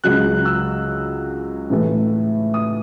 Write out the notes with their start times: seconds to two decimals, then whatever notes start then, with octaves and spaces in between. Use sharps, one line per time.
0.04 C#2 C#3 F#3 C#4 F#6
0.45 E6
1.70 A2 E3 A3
2.54 D#6